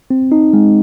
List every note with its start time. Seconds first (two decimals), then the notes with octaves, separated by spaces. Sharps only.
0.11 C4
0.32 D#4
0.53 G#3